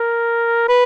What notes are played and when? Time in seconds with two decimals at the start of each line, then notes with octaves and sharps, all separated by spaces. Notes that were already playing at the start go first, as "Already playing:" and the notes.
Already playing: A#4
0.69 B4